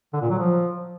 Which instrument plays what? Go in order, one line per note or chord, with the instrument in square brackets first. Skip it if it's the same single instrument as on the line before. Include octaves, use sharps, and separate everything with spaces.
[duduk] D3
A#2
F#3
F3